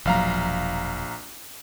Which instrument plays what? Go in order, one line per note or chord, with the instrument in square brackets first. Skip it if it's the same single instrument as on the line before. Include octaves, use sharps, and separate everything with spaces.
[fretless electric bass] E1 F3 F#3 [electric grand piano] A#1 F5 A#5